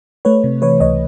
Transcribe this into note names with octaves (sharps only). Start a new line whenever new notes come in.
A3 B4 C#5
C3
E3 B4 C#5
C#2 C#5 D#5